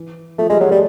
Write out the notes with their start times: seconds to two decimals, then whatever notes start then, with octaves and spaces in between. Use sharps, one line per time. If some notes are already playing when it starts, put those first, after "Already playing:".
Already playing: E3
0.38 F3 A3
0.49 G3 G#3
0.60 F#3 G#3
0.71 G3 A3